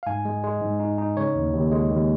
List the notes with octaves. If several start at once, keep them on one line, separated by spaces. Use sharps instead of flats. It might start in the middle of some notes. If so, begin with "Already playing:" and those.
F5
G#2 G#5
G#3
G#3
G#2
D#4
D#4
C#3 C#5
D#2
D#2
G#3
D#2